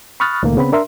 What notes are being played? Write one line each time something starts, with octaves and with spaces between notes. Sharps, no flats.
B5 C#6 D#6 F6 F#6 A6
C#2 A#2 D#3 A3 A#3
C#3 B3 C4 B5
D4 A#4 E5 C6